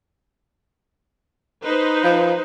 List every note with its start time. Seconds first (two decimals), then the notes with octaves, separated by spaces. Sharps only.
1.64 D#4 B4 C5
2.04 F3